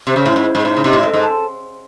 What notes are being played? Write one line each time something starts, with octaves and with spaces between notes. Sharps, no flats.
C3 C5
C#3
A2 E4
G#2
C5
G#2
A2 D#4
C#3
C3 D#5
A2
G#2 A4
G#2
A5